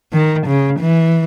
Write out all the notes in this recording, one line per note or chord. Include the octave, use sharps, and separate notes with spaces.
D#3
C#3
E3